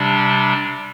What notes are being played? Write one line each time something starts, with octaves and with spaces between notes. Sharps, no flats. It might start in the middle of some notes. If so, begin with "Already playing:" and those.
Already playing: C3 G3 D4